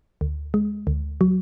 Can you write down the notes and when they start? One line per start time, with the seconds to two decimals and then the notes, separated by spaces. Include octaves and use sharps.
0.21 D2
0.54 G#3
0.87 D2
1.21 F#3